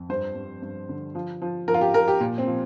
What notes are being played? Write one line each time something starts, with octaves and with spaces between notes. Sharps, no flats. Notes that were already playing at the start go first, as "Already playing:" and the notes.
Already playing: F2
G2 C5
G2
G2
D3
F3
F3
F3 A#4
F4
G4
F3 A#4
G4
A#2
C4
F3